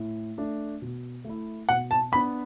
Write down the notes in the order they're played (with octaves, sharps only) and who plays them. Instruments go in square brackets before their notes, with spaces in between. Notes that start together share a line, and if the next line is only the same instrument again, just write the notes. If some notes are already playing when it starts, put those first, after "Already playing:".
Already playing: [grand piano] A2
A3 D4
B2
A3 E4
[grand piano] B2 [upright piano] F#5
[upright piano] A5
[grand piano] B3 D4 [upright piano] B5